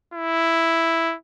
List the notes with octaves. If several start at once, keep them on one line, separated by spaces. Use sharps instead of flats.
E4